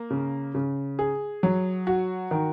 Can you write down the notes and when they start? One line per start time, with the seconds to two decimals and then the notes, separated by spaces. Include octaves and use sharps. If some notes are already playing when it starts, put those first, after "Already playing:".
Already playing: A#3
0.10 C#3
0.55 C#3
0.99 G#4
1.43 F#3
1.87 F#4
2.31 D#3